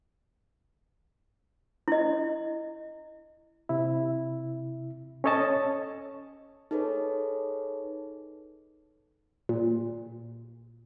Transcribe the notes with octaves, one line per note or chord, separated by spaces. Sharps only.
E4 D#5
C3 E4
C#4 A4 C#5 D#5 A5
D#4 G#4 A4 B4 C#5
A#2